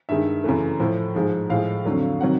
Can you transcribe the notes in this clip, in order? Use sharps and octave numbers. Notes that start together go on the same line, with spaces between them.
G2 D#3 G#3 E5
F#2 C#3 E3 A3
A2 F3 A3
G#2 F3 G#3
A2 F3 G#3 F5
F2 D3 F#3 A3
C3 D#3 F#3 F#5